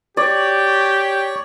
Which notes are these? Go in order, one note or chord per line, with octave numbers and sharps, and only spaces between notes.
G4 C#5 D5